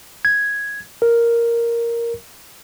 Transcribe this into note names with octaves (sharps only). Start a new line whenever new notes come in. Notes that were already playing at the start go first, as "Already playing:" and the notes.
G#6
A#4